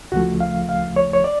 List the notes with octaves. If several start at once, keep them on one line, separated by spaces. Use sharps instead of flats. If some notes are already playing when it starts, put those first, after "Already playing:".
D2 C#3 F3 A3 F#4
F5
F5
C#5
C#5
D5